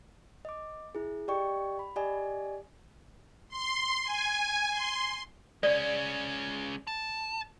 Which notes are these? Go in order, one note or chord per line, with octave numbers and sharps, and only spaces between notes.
D#5 D6
E4 G#4
G4 D5 D#5 G5 C#6
B5
G4 D5 D#5 G#5
C6
G#5
C6
G#3 C#4 D5
A5